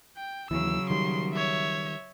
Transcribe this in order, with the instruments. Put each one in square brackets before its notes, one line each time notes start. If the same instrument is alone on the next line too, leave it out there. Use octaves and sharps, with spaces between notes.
[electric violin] G5
[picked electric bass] D#2 E3 [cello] C#3 F#3 [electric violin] E6
[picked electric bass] D#3 G3 [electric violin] C6
[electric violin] C#5 E5